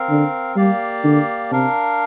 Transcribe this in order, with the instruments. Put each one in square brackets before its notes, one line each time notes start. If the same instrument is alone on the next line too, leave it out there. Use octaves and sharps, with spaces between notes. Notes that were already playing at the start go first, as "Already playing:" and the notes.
Already playing: [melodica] C4 A#4 F5
[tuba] D3
[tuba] G3 [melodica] A#3 G4 D5 F5
[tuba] D3
[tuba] C3 [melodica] D4 A#4 F5